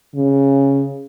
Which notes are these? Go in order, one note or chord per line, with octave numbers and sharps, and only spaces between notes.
C#3